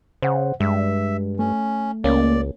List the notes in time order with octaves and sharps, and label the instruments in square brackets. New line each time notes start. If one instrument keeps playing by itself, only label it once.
[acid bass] C#3 [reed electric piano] C5 F#5
[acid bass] G2 [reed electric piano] G#3 [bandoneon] E5
[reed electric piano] A3 [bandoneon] C#4
[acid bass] C#2 [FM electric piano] A#3 C#4 [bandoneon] D5